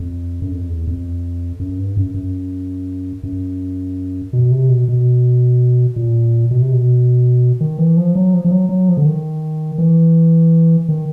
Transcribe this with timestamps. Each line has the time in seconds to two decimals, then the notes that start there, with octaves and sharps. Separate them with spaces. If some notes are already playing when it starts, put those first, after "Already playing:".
Already playing: F2
0.42 F#2
0.51 F2
0.70 E2
0.87 F2
1.60 F#2
1.79 G2
1.97 F#2
2.14 F#2
3.23 F#2
4.33 B2
4.51 C3
4.69 B2
4.88 B2
5.96 A#2
6.51 B2
6.61 C3
6.72 B2
7.61 D#3
7.79 E3
7.97 F3
8.15 F#3
8.34 F3
8.45 F3
8.51 F#3
8.69 F#3
8.88 F3
8.97 D3
9.06 D#3
9.78 E3
10.89 D#3